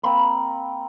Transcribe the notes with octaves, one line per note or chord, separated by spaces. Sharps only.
A#3 C4 G5 B5